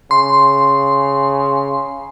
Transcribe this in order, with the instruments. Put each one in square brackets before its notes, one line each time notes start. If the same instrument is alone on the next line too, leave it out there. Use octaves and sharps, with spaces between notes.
[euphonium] C#3 [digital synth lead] C6